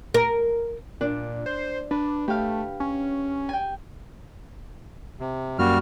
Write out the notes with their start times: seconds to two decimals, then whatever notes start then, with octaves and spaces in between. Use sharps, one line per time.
0.14 A#4
1.01 A#2 D4
1.46 C5
1.91 D4 B4
2.28 A3 G4 F5
2.80 C#4
3.49 G5 G#5
5.20 C3
5.59 F#2 G3 A#3 F#4 F6